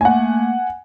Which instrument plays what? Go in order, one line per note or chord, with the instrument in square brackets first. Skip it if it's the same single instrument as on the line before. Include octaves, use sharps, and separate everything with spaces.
[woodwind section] A3 A#3 [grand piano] F#5 G#5